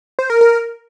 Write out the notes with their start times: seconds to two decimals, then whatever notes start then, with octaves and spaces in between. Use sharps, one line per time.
0.19 C5
0.30 A#4
0.41 A#4